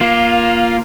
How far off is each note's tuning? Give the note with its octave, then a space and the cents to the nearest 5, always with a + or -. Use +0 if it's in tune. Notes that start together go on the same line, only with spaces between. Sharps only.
A#3 +15 F4 +0